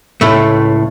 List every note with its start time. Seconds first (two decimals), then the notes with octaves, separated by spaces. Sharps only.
0.21 C#2 A2 A3